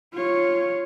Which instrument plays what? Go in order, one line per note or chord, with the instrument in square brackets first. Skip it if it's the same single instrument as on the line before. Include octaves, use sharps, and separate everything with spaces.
[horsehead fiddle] F4 C#5